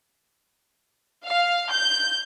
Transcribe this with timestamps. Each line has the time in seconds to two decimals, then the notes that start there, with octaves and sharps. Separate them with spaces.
1.26 F5
1.72 G6